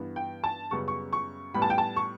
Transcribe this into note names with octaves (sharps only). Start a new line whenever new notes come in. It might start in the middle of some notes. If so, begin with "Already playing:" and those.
Already playing: G2 E3 B3
G5
A5
F#2 C#3 G3 B3 C#6
C#6
C#6
A2 G3 B3 B5
A5
G5
A5
C#6